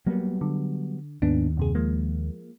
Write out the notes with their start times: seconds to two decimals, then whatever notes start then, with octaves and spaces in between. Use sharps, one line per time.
0.07 F#3 G3 A#3 B3
0.41 D3
1.22 D#2 G#2 B3 D4
1.57 F#2 C3 G#4
1.75 F3 G#3 A#3